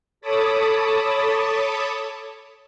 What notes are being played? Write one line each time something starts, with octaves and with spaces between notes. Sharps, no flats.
A4 C#5 A5 B5 D6 D#6